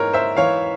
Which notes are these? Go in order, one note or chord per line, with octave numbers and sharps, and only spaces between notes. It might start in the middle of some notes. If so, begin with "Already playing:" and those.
Already playing: G#2 E3 A#4 C#5
C5 E5
E3 C#5 F5